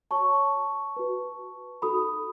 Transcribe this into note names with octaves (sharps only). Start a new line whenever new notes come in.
F#4 C#5 A5 C#6
F#4 B4
D#4 F#4 A4 B5 D#6